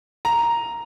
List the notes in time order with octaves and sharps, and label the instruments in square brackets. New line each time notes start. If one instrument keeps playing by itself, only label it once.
[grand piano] A#5